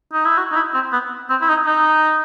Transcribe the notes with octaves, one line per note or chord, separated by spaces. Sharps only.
D#4
E4
F#4
D#4
E4
C4
B3
C4
E4
D#4
D#4